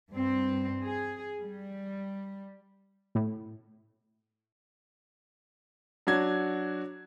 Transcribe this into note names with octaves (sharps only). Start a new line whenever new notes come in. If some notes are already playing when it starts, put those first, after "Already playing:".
G2 C4
G#4
G3
A2
F#3 D4 F#4 G#6